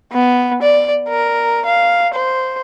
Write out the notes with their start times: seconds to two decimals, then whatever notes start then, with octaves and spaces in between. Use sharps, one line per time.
0.13 B3
0.62 D5
1.08 A#4
1.65 F5
2.13 C5